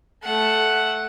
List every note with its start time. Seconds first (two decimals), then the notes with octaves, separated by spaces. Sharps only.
0.24 A3 F#5